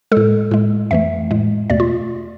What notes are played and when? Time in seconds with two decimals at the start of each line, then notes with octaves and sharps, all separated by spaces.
0.12 G#3 A4
0.17 A2
0.51 A2 G#3
0.91 F2 E3 A3 E5
1.31 A2 G#3
1.70 E2 B2 A3 D5
1.80 F4